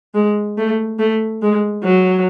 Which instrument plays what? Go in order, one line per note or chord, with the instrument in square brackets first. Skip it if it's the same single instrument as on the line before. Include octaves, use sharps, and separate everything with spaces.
[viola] G#3
A3
A3
G#3
F#3